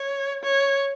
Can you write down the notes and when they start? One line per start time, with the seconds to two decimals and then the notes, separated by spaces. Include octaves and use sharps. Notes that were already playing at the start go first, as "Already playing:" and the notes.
Already playing: C#5
0.43 C#5